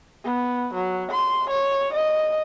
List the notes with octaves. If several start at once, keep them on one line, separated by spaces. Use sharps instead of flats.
B3
F#3
C6
C#5
D#5